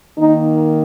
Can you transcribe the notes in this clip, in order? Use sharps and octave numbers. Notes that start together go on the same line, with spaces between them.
D#3 A#3 D#4